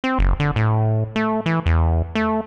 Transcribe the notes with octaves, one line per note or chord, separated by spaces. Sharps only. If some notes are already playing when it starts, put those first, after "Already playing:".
C4
F#1
D3
A2
A3
E3
E2
A3